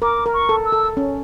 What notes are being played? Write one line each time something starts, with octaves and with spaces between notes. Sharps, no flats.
A#4 D6
A#4
C#6
A4
E6
A4
C#4